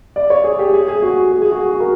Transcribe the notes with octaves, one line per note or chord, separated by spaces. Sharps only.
D5
C#5
G#4
G4
G#4
G#4
F#4
G#4
G#4
F#4
F#4
A#4